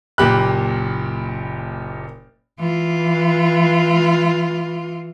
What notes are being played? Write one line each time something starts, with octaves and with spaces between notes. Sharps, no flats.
F#1 A#2 G4 B5 F#6
E3 F4